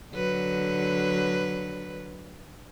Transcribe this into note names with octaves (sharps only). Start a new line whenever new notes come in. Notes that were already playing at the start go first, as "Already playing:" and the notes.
D3 F#3 B4